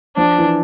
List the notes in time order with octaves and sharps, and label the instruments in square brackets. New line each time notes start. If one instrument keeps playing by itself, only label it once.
[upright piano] F3 [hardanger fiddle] D4
[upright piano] E3